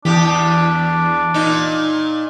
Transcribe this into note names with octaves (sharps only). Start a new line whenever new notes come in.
E2 E3 D4 G4
A#2 D#4